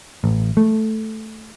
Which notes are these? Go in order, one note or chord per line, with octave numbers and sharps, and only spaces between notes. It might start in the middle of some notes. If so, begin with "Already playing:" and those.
A1
A3